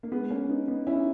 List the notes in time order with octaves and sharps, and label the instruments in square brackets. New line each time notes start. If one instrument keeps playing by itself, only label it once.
[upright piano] A#3
G#3 B3
A#3 C#4
B3 D#4
B3 D#4
C#4 E4
D#4